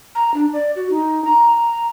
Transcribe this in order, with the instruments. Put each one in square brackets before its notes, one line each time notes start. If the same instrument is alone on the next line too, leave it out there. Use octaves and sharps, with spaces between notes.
[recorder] A#5
D4
D5
F#4
D#4
A#5